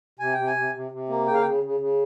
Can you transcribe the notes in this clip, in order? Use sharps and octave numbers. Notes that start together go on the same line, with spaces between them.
C3 G#5
C3 G5
G#5
C3
C3
C3
A#3
C#3 G5
F5
G5
C#3
C#3
C#3